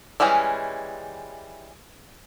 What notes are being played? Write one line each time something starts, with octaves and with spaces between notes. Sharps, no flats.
E3 G3 G#3 C#4 E4